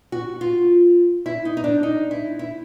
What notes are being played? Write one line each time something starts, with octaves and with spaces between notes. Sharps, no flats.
F#4
F4
E4
D#4
D#4
D4
D#4
E4
E4